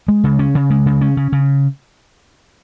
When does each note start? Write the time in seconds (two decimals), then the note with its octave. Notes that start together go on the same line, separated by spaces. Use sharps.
0.08 G#3
0.24 C#3
0.39 C#4
0.55 C#3
0.70 G#3
0.86 C#3
1.01 C#4
1.17 C#3
1.32 C#3